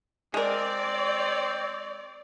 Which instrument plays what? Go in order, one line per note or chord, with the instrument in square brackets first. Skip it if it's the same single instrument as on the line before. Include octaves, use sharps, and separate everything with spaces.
[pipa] G#3 A#4 [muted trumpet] C4 [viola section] D5